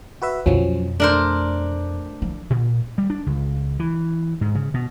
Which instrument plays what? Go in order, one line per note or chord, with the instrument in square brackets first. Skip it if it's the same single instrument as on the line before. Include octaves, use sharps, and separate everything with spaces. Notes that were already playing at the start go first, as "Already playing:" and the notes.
[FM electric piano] F#4 B4 E5
[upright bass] F2 B2 [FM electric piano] F3 F#3 C#4
[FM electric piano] A3 [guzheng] D4 A#4 C5
[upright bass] F3
[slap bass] A#2
G3
D4
C#2
E3
G#2
C#3
B2